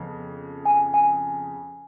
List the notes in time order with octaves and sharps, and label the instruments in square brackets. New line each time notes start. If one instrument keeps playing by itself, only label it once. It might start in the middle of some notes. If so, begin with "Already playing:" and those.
Already playing: [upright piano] F2 C#3 B3
[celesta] G#5
G#5